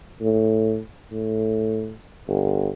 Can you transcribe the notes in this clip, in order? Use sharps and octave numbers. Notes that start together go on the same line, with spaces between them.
A2
A2
G1